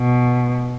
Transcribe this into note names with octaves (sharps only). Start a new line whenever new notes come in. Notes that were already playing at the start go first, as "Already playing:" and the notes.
Already playing: B2